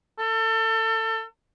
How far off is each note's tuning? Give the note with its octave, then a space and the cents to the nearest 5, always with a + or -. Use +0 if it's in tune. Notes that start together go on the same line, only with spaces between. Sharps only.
A4 +30